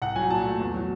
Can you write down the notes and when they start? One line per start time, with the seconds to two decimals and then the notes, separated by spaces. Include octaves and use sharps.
0.02 C2 F#5
0.16 F#3 G#5
0.30 A#2 A5
0.45 A3
0.60 E2
0.74 F#3